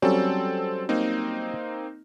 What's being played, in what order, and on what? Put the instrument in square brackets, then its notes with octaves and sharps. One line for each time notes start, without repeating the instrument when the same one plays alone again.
[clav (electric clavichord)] F#3 G3 C#4 [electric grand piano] C4 A4
[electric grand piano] A#3 C4 D#4